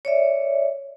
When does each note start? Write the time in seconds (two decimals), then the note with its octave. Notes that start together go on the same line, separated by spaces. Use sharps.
0.05 C#5 D5 E5